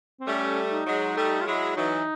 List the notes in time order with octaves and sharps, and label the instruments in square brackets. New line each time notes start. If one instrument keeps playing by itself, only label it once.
[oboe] C4
[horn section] G3 A3 [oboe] C#4
[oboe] D#4
[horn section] F#3 G#3
G3 A3
[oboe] F4
[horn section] F#3 G#3 [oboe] E4
[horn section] E3 F#3 [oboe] D#4